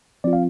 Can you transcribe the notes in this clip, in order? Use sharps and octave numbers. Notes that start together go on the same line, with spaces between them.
F3 C4 F4 D5
F5